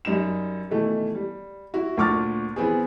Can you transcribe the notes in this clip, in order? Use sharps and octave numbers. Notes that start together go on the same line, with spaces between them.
F#2 G3 D#4 E7
B2 D#3 E3 A3
G3
E4 F#4
D2 A#2 C#6 D6 F6 A6
E3 B3 C4 G#4